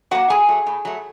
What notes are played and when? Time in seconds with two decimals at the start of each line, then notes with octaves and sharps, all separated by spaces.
0.11 F#3 A#3 F#4 F#5
0.30 A2 G#4 G#5
0.48 F#3 A3
0.67 A2
0.85 F#3 A3